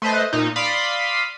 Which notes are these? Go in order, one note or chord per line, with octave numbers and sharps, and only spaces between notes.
A3 B4 C5 D#5
A#2 D#4
D5 F5 B5 C6 D#6 B6